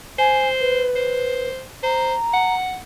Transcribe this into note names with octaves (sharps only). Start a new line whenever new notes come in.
C5 G#5
B4
C5
C5 A#5
F#5